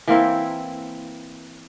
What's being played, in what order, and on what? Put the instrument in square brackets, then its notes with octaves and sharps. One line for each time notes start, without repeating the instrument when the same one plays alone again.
[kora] E3 A#3 C4 E4